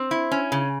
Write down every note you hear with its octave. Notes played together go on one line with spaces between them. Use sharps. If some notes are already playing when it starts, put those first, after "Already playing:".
Already playing: C4
E4
C#4
C#3